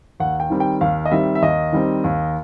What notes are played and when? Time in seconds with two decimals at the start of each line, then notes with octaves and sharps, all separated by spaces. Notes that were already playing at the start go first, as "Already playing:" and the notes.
0.20 D#2 F#5
0.40 G5
0.50 D#3 G3 C4
0.60 G5
0.81 D#2 F5
1.05 D#5
1.11 D#3 G3 C4 E5
1.35 E5
1.42 D#2 D#5
1.73 D#3 G3 C4
2.04 D#2